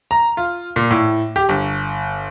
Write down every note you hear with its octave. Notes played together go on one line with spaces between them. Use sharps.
A#5
F4
A#2
A2
G4
G1